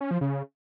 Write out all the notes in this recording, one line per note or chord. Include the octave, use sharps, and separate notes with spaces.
C#4
F3
C#3